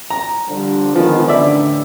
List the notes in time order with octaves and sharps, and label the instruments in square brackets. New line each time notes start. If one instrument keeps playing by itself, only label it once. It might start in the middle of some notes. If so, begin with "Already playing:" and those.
[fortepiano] A#5
[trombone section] D3 F3 D4 [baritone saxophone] G3
[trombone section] D3 G#3 B3 [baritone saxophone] D#3 [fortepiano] F3
[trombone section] A1 [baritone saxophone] D3 [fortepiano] D5 E5